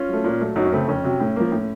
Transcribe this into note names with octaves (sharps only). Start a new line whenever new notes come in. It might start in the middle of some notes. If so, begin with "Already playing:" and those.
Already playing: C#4 F4
F#3 A3
A#2
F#3 A3
F#2 D#4 F#4
C#4
C#3 A3 C4
F2 C#4
C3 F#3
A2
F3 A#3
A2